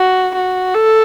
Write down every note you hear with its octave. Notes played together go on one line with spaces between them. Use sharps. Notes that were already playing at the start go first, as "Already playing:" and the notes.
Already playing: F#4
F#4
A4